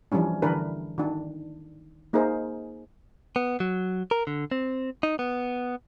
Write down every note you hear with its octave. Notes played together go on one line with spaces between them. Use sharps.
E3 F3 G3 C#4 D4
D3 E3 D4 A#4 B4
D#3 D4
A#3 D#4 G#4 A#4 C5
B3
F#3
A#4
D3
C4
D#4
B3